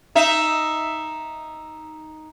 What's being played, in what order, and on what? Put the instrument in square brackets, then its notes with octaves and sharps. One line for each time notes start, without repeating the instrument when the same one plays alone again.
[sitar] D#4 E5